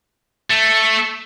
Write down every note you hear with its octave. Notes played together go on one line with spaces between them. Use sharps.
A3